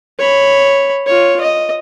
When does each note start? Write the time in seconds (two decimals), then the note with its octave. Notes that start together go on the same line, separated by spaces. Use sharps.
0.19 C#5 B5
1.06 F4 C#5
1.40 D#5